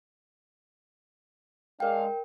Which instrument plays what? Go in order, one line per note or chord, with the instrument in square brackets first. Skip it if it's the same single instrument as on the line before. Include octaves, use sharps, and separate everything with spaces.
[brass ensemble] G#3 D4 F5 [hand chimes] A#4 G5